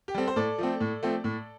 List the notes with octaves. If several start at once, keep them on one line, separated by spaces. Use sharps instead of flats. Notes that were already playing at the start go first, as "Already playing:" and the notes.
G4
G3 C4 A4
C5
A2 A4 D5
F3 A3 C4
A2
F3 A3 C4
A2